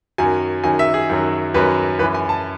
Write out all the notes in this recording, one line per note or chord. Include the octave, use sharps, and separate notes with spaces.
F#2 D#3 F#3 G#5
F#2 D#3 F#3 G#5
E5
G#4
F#2 D#3 F#3
F#2 D#3 F#3 B4
F#2 E3 B4
G#5
A5